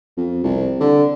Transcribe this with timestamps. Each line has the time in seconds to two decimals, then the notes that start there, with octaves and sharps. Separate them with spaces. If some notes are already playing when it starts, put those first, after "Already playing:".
0.17 F2
0.44 C2
0.80 D3